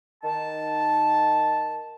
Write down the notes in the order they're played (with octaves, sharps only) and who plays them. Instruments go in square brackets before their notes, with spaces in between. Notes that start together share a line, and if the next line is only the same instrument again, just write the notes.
[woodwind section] D#3 A5